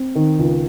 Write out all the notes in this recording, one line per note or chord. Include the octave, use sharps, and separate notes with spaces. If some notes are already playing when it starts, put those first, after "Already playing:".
Already playing: C4
D#3
C#2